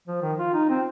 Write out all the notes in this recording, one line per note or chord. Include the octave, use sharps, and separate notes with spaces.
F3
D#3
F4
D#4
C4